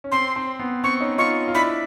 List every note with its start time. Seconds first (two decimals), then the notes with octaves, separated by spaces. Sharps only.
0.04 C#4
0.12 C4 C6
0.36 C4
0.59 B3
0.84 C4 C#6
1.00 C#4 D#4
1.18 D#4 F4 C#6
1.48 F4
1.55 D4 E4 B5